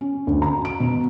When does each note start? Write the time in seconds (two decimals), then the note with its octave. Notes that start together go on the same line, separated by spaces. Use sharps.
0.01 C#4
0.27 D2
0.42 A#5
0.65 D7
0.80 B2